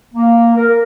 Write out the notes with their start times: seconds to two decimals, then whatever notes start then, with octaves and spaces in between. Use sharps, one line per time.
0.14 A#3
0.55 A#4